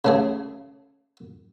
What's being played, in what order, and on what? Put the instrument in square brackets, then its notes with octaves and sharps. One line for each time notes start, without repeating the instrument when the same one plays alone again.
[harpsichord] C#3 A3 G#4